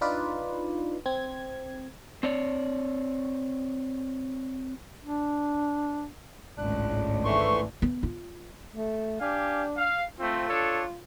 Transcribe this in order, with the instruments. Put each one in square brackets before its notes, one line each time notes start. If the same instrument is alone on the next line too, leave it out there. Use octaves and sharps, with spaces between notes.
[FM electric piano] D4 D#4 F4 B4 D5
C4 G#6
[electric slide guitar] C4 C#5 D5
[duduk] D4
[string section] G#1 C#2 A2 [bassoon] D4 [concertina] F#6
[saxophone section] G#2 E3 [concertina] A3 C6 C#6
[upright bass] B3
F4
[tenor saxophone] A3
[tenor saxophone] D4 [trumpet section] G4 F5 G#5
[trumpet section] F5
[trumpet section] A3 C4 [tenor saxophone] F4
[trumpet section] D4 A4 C#5